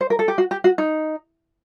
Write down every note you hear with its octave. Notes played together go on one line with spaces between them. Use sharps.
C5
A#4
A4
G4
F#4
G4
F#4
D#4